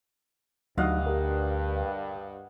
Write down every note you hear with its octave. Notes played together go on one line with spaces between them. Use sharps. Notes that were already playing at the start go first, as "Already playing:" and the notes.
D2 G2 D3 F#3 D#4 D#5 F5 F#5
G4 A#4